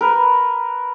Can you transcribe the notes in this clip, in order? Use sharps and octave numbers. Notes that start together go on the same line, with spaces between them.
A#4 B4